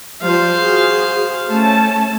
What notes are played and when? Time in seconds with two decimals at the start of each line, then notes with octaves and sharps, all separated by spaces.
0.22 F3 G3 F4 C5 F5
0.56 F#4 G#4
1.50 A3 C#4 A5